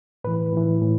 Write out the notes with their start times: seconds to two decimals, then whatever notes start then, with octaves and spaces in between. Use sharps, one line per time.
0.24 A2 E3 B4
0.53 A2 E3
0.82 A2